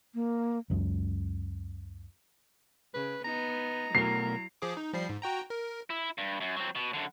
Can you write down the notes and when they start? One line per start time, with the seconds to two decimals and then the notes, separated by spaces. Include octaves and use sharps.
0.15 A#3
0.70 C#2 F#2
2.94 C#3 B4
3.24 B3 D#4 A#5
3.95 B2 F#3 A3 E4 A#4 C7
4.62 F3 G#4 D6
4.77 D#4
4.94 F3 G3 C7
5.09 G#2
5.22 F#4 G5 A#5
5.50 A#4
5.90 E4
6.18 G2
6.41 F#2
6.57 F#3 C4
6.75 B2
6.94 F#2 D3